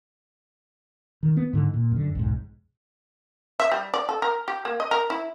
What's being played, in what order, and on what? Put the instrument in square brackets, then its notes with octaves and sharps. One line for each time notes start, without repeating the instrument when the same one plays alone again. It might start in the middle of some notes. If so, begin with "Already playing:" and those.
[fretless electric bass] D#3
B3
G#2 D3
A#2
F#2 D3
B1 F2 G#2
[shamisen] E5
G3
D5
A4
A#4
G4
A#3
D#5
A#4
E4